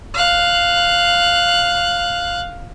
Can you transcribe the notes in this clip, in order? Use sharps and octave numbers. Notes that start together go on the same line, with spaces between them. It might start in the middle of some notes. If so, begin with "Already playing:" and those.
F5 F#6